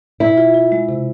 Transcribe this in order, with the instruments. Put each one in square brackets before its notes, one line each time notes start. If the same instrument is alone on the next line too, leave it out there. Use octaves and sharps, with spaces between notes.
[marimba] B2 [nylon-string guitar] E4
[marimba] F4
F4
G#3
C3